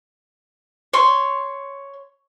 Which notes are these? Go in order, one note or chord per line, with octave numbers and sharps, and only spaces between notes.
C#5 C6